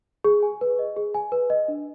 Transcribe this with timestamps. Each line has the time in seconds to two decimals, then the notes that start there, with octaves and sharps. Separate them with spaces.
0.24 G#4
0.43 G#5
0.61 B4
0.79 D#5
0.97 G#4
1.15 G#5
1.32 B4
1.50 D#5
1.68 D4